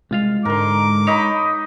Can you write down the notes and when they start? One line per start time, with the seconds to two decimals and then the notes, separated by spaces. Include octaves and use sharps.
0.11 C2 G#3 F4 F5
0.45 G#2 D3 A#4 C6 D6
1.07 D#4 C#5 D#5 B5